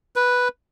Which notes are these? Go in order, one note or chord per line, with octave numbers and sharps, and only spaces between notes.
B4